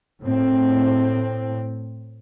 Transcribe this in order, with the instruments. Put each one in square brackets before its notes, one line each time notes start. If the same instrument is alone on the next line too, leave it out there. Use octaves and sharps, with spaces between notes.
[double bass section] A2 C4